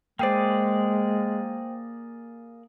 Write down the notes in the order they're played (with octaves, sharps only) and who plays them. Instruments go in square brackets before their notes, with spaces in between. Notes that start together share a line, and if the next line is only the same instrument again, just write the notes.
[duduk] G#3 [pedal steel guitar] A#3 G#4 D5 [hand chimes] C5 G5